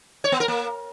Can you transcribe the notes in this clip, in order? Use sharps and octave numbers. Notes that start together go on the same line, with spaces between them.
C#5
B3
A#4
A#3